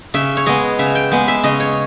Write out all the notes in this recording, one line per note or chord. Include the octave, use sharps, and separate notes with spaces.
C#3 E5
C#5
G#3 B3 D#5
C#3 E5
G5
G#3 B3 G#5
E5
C#3 D#5
C#5